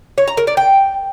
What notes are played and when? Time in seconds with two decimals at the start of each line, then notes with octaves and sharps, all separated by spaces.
0.18 C#5
0.28 A#5
0.37 A#4
0.47 D5
0.57 G5